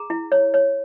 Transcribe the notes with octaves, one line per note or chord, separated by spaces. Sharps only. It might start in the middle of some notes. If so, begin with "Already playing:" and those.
Already playing: G#4 A#5
E4
C#5
C#5